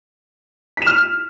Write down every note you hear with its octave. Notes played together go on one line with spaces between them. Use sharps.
F6 B6 E7